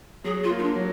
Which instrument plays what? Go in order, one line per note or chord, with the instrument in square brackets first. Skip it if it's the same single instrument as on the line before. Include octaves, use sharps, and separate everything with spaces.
[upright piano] F#3 [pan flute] G#4
[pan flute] F4
[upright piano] A#3
[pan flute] D#4
D4
[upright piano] F#3